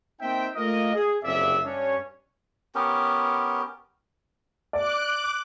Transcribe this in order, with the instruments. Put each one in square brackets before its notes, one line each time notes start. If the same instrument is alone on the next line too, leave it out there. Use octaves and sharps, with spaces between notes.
[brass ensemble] A#3 C4 D#4 E5 G5
A3 A#3 F4 A#4 D#5
G#4
F#1 F2 C3 G#4 D5 E5
G2 C#4 D4 C#5
[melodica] B3 C#4 G4 A#4
[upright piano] D5 [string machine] D6 F#6